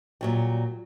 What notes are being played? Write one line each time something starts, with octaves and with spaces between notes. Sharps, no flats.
A#2 F#3 G3